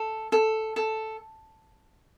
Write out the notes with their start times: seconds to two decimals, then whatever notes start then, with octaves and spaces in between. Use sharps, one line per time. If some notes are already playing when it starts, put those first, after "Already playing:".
Already playing: A4
0.32 A4
0.76 A4